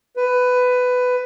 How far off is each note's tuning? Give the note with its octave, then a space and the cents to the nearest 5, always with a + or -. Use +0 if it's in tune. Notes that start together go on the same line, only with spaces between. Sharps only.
B4 +15